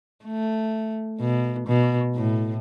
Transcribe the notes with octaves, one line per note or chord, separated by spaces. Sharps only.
A3
B2
B2
A2